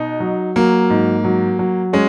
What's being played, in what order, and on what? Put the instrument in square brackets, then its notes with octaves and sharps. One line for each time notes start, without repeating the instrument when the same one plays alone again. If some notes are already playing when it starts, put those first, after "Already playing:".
Already playing: [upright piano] B2 [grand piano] D#4
[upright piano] F#3
[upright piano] F#3 [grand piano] A#3
[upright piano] G#2
F#3
F#3
[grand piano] G#3 [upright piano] C#4